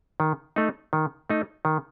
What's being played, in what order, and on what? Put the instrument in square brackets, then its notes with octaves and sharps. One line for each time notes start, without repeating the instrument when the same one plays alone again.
[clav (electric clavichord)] D#3
A3 D#4
D#3
A3 D#4
D#3